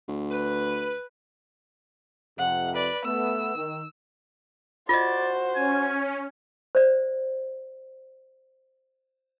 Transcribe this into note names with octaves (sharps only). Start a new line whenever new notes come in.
D2
B4
F2 C3 F#5
B4 D5
A3 B3 E6
D#3
F4 F#4 C5 D5 D#5
C#4 G#5
C5 D5